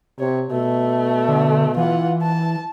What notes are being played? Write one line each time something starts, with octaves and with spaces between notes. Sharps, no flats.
C3 C#5
B2 A3
D3
E3 F4 F#5
A5